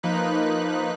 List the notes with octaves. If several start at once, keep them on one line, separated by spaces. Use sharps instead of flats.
F3 A#3 D#4 B4 F#6